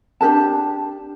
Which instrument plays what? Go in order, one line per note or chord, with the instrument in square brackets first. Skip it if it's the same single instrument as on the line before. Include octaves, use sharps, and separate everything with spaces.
[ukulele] D4 G4 A#4 A5